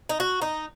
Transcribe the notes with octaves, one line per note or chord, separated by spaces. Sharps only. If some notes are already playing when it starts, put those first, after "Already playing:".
D#4
F#4
D#4